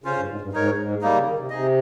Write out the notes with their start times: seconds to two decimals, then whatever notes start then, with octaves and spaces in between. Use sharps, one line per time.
0.04 C#3 C#4 F4 C5 F5
0.17 G2
0.28 G#2
0.41 G2
0.53 G#2 D#4 A#4 C#5
0.78 G#2
1.01 G3 A#3 D#4
1.14 C#3
1.26 D#3
1.39 C3
1.50 C3 D#4 G#4 D#5